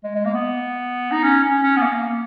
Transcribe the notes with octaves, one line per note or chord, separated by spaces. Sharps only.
G#3
G#3
A#3
B3
D#4
C#4
C#4
C#4
B3
A#3